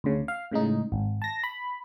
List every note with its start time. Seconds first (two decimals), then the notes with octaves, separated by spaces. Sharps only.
0.04 D2 C#3
0.28 F5
0.52 A2 C#3 G#3 D#4
0.92 G#1
1.22 A5 A#6
1.43 B5